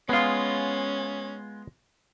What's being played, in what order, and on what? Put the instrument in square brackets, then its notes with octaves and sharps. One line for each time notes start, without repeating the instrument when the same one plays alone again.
[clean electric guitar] G#3 F4 [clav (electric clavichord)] B3 F5 [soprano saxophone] C#4